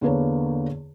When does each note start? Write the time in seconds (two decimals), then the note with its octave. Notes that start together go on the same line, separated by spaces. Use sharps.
0.01 E2 D3 A#3 B4 C#5